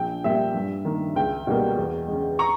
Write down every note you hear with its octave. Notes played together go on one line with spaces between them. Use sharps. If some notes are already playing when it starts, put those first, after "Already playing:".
Already playing: A#1 G5
A#2 G3 A#3 E5
G2
D#3 A#3
C#2 G5
B2 G3 A#3
E2
C#3 G#3
A#5 C#6